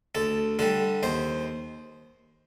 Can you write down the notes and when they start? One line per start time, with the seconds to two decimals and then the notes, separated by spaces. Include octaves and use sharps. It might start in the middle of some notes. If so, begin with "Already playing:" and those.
0.15 D2 A4
0.59 D3 G3 A4
1.03 D#2 C5